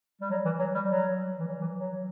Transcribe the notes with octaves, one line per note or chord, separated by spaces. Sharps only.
G3
F#3
E3
F#3
G3
F#3
E3
F#3
E3
F#3